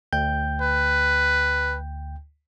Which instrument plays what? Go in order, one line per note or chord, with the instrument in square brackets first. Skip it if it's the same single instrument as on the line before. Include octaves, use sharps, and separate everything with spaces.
[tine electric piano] D2 G5 G6
[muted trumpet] B4